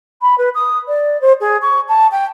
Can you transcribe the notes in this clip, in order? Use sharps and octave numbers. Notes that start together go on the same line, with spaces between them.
B5
B4
D#6
D5
C5
G#4
C#6
A5
G5